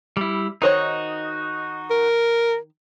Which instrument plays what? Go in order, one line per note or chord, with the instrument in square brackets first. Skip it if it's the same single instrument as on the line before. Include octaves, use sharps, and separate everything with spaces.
[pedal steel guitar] G3 E4
[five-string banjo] D#3 C5 C#5 [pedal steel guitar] D#4 F#4 D#5
[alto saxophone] A#4